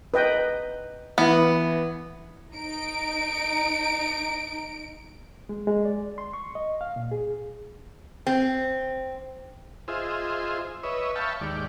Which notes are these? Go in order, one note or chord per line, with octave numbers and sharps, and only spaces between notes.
B4 D#5 G5
E3 B3
D#4 D7
G#3
G#3
D5
C6
C#6
D#5
F5
A#2
G#4
C4
F4 G#4 C5 D#5 E5
B4 C#5 D#5 E5
E5 F5 G5 A5 B5 C#6
D#2 G#2 G4 D5